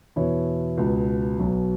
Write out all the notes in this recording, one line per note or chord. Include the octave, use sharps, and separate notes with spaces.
E2 B2 B3 E4 C#5
C#2 B2 B3
B1 B2 F#3